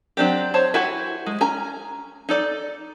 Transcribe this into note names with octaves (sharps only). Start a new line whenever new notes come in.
F#3 C4 D4 G4
C5 C#5 A5
E4 F#4 G4 F#5 G#5
G#3
C#4 G#5 A#5
D#4 A4 D5